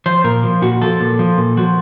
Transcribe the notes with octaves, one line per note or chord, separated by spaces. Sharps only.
F3 C5
A#2 A#4
F3
A#2 F#4
F3 A4
A#2
F3
A#2
F3 F#4